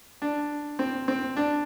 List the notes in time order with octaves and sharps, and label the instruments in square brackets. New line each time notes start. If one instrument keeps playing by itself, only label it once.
[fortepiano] D4
C4
C4
D4